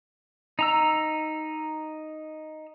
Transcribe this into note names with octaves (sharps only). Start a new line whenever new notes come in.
D#4 A#5 E6